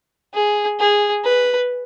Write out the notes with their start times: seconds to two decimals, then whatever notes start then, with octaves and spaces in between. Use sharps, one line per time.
0.34 G#4
0.79 G#4
1.24 B4